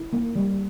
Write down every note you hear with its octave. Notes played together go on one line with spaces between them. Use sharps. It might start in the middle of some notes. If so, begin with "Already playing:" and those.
Already playing: E4
A#3
G3